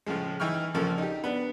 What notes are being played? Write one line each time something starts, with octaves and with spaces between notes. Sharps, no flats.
A2 C#3 F3 G#3
E3 D#4 E4 G5 C#6 F6
A#1 C#3 F3 A#3 A4
D#4 G4
B3 D4